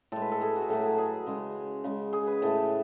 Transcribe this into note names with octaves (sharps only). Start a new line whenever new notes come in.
A2 G#3 A4
B4
A4
G#4
F#4
G#4
A2 F#3 A3 A4
G#4
G#4
C#3 G#3
C#3 G#3
G#4
B4
A2 E3 A3 A4